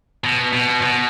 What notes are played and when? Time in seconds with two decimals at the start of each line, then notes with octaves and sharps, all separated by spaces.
0.24 B2
0.53 B2
0.82 B2